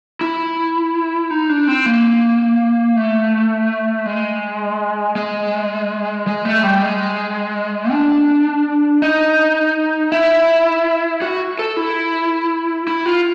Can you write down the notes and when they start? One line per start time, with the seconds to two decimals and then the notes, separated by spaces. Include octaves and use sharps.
0.21 E4
1.31 D#4
1.49 D4
1.67 C4
1.86 A#3
2.96 A3
4.06 G#3
5.16 G#3
6.27 G#3
6.45 A3
6.63 G3
6.81 G#3
7.91 D4
9.02 D#4
10.12 E4
11.22 F#4
11.59 A4
11.77 E4
12.87 E4
13.06 F4